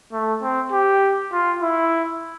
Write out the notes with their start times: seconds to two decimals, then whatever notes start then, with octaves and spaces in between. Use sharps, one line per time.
0.12 A3
0.42 C4
0.72 G4
1.32 F4
1.62 E4